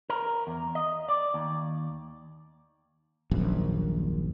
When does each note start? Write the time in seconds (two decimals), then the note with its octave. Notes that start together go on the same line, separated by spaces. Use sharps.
0.10 A#4
0.47 E2
0.75 D#5
1.09 D5
1.34 D#2
3.31 D#1 A#1 F#2